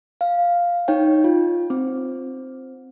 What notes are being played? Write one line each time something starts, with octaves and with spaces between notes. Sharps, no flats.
F5
D#4 C#5 G5
F4
C4